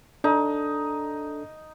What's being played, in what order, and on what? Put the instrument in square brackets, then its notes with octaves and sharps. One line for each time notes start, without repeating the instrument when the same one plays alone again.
[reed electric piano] D4 A4 [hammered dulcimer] D#4